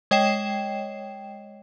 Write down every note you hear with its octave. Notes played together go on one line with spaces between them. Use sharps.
G#3 C#5 D#5 G5 C7 E7